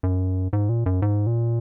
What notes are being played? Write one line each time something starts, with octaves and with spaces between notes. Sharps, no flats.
F#2
G#2
A#2
F#2
G#2
A#2